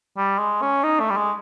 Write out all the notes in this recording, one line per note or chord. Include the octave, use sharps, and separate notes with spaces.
G3
G#3
C#4
D#4
A3
G3
G#3